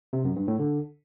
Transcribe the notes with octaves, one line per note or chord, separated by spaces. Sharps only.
C3
F#2
G2
A2
D3